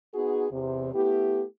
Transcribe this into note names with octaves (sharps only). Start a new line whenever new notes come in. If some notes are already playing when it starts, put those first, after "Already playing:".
B3 D#4 F#4 G#4
E2 C3
A3 B3 E4 G4